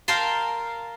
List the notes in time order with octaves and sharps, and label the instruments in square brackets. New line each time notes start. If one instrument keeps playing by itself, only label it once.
[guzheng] A#4 F5 G5 A5 C6